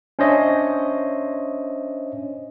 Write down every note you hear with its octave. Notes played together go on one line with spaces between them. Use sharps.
C#4 D4 C5 C#5 D#5 E5